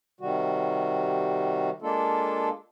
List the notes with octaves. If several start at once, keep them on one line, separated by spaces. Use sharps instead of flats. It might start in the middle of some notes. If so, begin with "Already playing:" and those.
C3 D#3 G3 F#4
G#3 A#3 D4 F4 A4